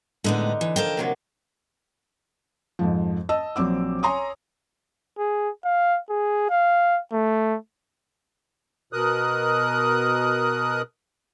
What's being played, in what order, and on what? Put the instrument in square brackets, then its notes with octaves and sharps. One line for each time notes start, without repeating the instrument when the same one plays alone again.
[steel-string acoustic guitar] A2 G#3 B3 [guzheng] D3 D#4
[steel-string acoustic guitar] E3
[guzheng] F3 [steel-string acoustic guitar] A4 A#4 G5
[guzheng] C3 F#3 A#3
[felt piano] F2 G#2 F3
D#5 A5 E6
A#1 F#3 C4 D6 E6
C#5 G#5 A#5 C6 D#6
[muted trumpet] G#4
F5
G#4
F5
A3
[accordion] B2 A#4 D#6 F#6